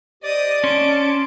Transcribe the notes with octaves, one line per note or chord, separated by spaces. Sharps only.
G4 C5 D5 D#5 D#6
C#4 A5 C6 D7